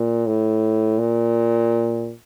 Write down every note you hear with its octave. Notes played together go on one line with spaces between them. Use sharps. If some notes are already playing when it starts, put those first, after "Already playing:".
Already playing: A#2
A2
A#2